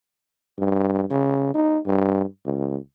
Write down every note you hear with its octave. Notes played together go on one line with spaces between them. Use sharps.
G2
C#3
D#4
G2
C#2